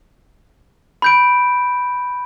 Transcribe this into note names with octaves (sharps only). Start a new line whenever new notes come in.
B5 G6 D7